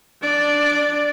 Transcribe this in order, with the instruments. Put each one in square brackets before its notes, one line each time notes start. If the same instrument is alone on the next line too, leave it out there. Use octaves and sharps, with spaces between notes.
[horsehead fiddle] D4 D5